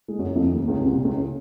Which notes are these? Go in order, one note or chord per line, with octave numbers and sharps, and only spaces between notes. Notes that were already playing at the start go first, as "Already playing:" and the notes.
G#3
F#2 F#3
F2 F3
D#2 D#3
C#2 C#3
C2 C3
A#2
C#2 C#3
C#3